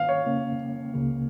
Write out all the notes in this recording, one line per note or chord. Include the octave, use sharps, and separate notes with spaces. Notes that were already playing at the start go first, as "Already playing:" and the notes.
Already playing: G#2 D#3 A#3 C#4 F5
C#5
C#3 A#3 C#4
C#2 C#3 A#3